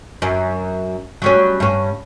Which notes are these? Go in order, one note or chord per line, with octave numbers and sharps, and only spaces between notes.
F#2
F#3 G3 C#4
G2 C#4